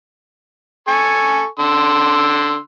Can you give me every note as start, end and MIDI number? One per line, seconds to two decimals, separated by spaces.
0.88 1.46 69
0.88 1.46 80
0.88 1.46 85
1.59 2.58 50
1.59 2.58 84
1.59 2.58 88